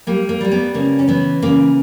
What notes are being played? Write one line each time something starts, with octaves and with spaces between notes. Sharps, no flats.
G3 A#3
A#3
G3 A#3
B3
C#3 A#3
C#4
E3 B3
C#3 A#3